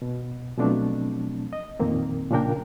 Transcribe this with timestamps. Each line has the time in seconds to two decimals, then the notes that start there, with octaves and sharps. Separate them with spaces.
0.02 B2
0.58 B2 F3 F#3 A3 C4 D4
1.53 D#5
1.80 F2 A#2 D#3 A#3 C4
2.30 A#2 C#3 F3 D4 A#4 G5